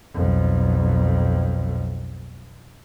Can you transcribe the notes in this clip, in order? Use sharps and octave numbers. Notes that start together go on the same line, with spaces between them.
B1 F2